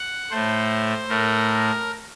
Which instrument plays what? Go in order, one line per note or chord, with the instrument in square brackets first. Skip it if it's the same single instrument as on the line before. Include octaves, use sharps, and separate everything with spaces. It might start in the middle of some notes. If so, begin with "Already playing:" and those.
Already playing: [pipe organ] F#5
A2 A3 C5
A2 A3 A#4